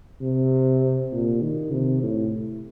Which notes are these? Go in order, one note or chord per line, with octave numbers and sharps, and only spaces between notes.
C3
A#2
D#3
C3
A2